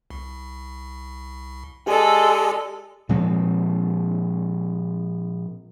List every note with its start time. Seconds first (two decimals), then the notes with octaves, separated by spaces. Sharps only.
0.10 C2
1.87 G#3 G4 A4 D5
3.09 A#2 F3 G#3 C4